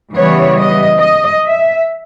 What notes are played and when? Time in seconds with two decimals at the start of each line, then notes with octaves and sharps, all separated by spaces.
0.15 C#3 E3 G3 B3 C#5
0.58 D#5
1.01 D#5
1.44 E5